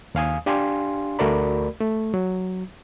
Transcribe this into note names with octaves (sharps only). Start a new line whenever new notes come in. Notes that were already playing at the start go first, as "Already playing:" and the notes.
D#2 F5 G#5 D#6
D4 G4 F5 G#5 C6
D2 A3 F#4 A#4 D5 B5
A3
F#3